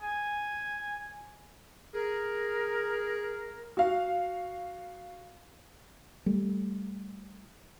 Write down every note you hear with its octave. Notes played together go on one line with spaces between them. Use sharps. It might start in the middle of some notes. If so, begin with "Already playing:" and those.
G#5
G#4 A#4
F#4 F5
G3 A3